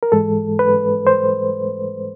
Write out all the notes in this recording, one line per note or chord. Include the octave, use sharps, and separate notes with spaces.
A#4
G#2 E3 G#3 A4
B4
C5